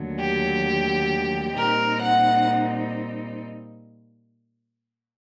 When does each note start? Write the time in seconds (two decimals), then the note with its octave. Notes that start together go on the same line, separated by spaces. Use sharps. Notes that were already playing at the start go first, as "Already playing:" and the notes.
Already playing: D#2 D3 F#3 A3
0.19 G4
1.57 A#2 G3 C4 D#4 A#4
2.02 F#5